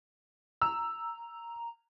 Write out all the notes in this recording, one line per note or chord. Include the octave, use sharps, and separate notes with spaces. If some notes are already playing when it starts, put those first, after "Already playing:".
A#5 E6